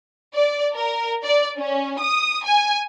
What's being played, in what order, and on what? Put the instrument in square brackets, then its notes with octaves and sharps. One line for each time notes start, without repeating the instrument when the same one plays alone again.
[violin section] D5
A#4
D5
C#4
D#6
G#5